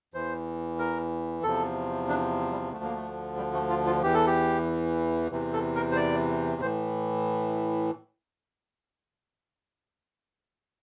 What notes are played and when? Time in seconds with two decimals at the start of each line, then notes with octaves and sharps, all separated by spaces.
0.14 E2 E3 C5
0.79 A#4
1.43 E2 C3 F3 A4
2.09 D4
2.52 G3
2.73 D2 D3 F3 A3
2.83 A#3
2.95 A3
3.37 G3
3.54 A3
3.70 F4
3.86 F4
4.03 E2 E3 G4
4.14 A4
4.27 G4
5.31 E2 C3 E3
5.53 A4
5.75 A#4
5.92 C5
5.96 D5
6.62 A2 E3 C5